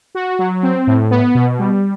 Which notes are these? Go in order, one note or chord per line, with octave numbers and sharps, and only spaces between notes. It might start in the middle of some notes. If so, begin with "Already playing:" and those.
F#4
F#3
C4
A2
B3
B2
G3